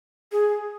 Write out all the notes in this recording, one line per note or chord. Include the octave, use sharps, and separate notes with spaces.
G#4